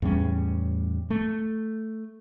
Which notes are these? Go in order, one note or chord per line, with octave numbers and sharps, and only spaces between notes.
E2 A2 G3 C#4
A3